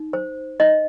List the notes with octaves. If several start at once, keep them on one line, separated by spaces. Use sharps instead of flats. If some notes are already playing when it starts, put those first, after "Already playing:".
Already playing: D#4
C5
D#4 D#5